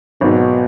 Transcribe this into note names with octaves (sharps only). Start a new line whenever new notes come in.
G#1 G#2 B2 F#3